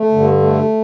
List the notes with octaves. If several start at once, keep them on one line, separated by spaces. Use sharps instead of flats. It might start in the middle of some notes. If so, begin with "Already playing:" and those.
Already playing: A3
G2 D3
A3